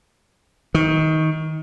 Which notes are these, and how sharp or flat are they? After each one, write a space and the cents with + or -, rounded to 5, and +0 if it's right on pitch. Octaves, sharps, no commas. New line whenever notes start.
D#3 +20